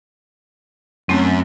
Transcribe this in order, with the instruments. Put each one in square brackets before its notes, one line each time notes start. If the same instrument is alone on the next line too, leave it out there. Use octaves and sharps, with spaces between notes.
[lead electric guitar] F#2 F#4 [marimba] A3 C4